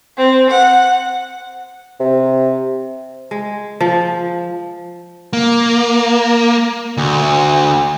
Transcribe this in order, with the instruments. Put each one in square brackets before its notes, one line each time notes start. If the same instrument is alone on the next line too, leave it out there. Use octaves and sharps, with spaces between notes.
[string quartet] C4
F#5
[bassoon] C3
[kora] G#3
F3
[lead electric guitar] A#3
D2